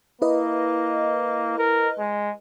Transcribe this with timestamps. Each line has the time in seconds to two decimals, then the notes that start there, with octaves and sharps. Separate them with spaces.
0.22 A#3 E4 B4 D#5
1.58 A#4
1.99 G#3